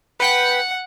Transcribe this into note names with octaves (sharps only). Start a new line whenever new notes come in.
B4 F#5 G5 B6